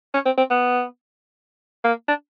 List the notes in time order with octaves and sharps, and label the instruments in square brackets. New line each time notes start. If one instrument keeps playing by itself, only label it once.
[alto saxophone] C#4
C4
C4
B3
A#3
D4